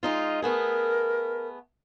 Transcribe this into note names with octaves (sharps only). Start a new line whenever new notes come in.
G#3 D#4 F4
A3 B3 G#4 A#4